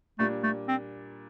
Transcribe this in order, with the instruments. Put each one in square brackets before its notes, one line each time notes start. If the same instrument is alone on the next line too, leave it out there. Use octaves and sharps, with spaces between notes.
[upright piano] A#2 G3 D4 [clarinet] A3
[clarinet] A3
C4